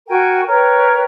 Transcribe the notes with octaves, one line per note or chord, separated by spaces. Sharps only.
F#4 A#4 G5 G#5
A#4 B4 C#5 G5